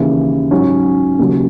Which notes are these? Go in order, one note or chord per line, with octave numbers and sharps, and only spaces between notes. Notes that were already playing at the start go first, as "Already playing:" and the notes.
Already playing: D#2 C#3 E3
G#2 F#3 C#4
D#2 C#3 F#3